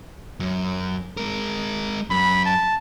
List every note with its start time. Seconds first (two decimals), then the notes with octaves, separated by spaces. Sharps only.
0.40 F#2
1.17 G#3 A#4
2.10 F#2 B5
2.45 A5